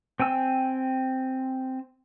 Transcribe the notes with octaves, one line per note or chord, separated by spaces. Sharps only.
C4 G5 G#5 E6